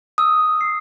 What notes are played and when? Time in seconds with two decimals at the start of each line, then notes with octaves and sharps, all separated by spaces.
0.18 D#6 E6
0.61 C7